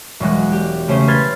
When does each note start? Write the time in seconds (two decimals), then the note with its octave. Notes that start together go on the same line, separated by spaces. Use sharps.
0.20 E1 F#3 G#3 F#6
0.52 G4
0.88 C#3 A3 C#4 C5
1.08 B4 C6 F6 G#6 A6